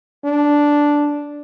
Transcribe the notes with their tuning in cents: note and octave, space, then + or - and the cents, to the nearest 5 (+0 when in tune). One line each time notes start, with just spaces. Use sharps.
D4 -5